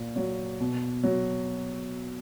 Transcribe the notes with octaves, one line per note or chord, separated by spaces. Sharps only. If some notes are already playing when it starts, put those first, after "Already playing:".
Already playing: A#2
F#3
B2
F#3